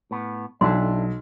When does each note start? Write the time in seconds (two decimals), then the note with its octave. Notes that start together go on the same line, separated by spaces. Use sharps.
0.11 A2 B3
0.61 B1 D4 E4 A4 C6